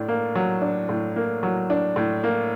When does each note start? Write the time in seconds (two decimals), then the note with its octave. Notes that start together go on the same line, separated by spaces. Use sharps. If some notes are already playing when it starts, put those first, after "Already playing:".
Already playing: A2 D4
0.08 A#3
0.35 F#3
0.61 D4
0.89 A2
1.16 A#3
1.43 F#3
1.70 D4
1.96 A2
2.24 A#3